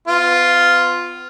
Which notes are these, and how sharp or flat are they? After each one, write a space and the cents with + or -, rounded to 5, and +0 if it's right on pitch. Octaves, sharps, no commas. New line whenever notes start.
B3 +35 F4 +0